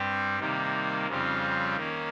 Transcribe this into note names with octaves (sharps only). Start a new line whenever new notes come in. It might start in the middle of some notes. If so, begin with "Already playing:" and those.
Already playing: G2 G3 C4 G4
C3 D#3 G3 A#3
F2 C#3 G3 C4 F4
D#3 A#3 C#4